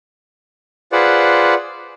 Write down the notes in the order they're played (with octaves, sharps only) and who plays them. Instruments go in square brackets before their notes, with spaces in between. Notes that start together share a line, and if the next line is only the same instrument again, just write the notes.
[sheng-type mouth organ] F4 G#4 B4 C5 D5 F#5